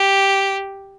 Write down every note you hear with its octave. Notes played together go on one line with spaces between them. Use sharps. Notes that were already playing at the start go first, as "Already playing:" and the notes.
Already playing: G4